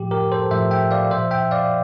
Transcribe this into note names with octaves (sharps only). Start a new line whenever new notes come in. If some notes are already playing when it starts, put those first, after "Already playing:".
Already playing: A2 F3 G4
G4 A#4
A4 C5
A2 F3 C5 E5
E5 G5
D5 F5
A#2 F3 C5 E5
E5 G5
D5 F5